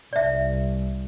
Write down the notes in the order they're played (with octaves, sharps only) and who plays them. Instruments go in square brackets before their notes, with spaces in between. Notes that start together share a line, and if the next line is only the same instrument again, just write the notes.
[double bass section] C2 [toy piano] D5 E5